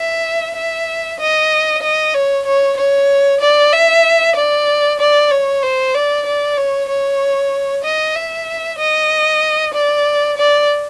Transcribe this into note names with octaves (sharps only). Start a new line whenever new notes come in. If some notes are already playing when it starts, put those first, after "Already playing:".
Already playing: E5
E5
D#5
D#5
C#5
C#5
C#5
D5
E5
D5
D5
C#5
C5
D5
D5
C#5
C#5
D#5
E5
D#5
D5
D5